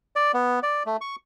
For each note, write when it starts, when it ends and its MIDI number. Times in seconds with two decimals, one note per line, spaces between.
0.16 0.32 74
0.34 0.60 59
0.63 0.83 74
0.86 0.97 57
1.01 1.16 85